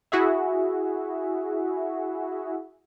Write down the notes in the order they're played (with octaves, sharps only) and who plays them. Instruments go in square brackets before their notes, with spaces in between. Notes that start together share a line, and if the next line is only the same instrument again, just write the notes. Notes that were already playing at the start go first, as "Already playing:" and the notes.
[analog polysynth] E4 F#4 G#4 E5